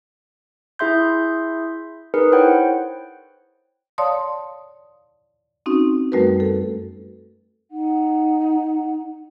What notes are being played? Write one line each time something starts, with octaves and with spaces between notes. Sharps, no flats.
E4 G#4 E5 C6 G6
D#4 G#4 A#4 B4 C#7
E4 C5 C#5 F#5 G5
C#5 D5 F5 A5 C6 D#6
C4 C#4 D#4 F#4
F#2 G3 A3 F#4 A#4 B4
A4
D#4 F#5